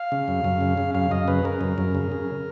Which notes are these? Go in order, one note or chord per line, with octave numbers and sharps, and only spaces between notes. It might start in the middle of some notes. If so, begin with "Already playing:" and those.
Already playing: F5
C#3
F#2
F#2
C#3
C#3
F#2 F5
F#2 D#5
C#3 B4
C#3 A#4
F#2
F#2
C#3
C#3